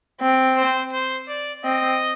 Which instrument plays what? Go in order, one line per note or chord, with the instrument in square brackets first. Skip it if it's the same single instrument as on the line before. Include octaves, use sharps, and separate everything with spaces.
[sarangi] C4
[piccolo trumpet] C5
C5
D5
[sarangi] C4 [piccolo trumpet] D#5